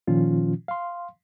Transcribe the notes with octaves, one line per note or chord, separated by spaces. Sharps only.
A#2 D#3 F3 C#4 F4
F5 C6